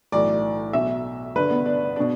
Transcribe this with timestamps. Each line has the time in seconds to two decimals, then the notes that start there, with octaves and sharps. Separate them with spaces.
0.12 B1 A2 E3 D5
0.73 B1 B2 E5
1.35 G1 G2 D3 B4
1.50 B3
1.66 D4
1.96 B2 D4